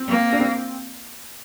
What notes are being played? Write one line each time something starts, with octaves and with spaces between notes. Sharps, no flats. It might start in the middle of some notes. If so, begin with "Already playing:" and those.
Already playing: C4
A#3
D4
C4